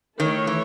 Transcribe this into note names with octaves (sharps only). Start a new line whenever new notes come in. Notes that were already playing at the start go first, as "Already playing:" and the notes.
D#3 A3 E4 A4 C#5
E3